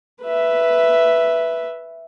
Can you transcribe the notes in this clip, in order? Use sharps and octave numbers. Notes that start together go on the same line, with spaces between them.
B4 E5